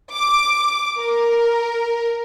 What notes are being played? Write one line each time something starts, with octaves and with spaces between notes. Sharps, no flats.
D6
A#4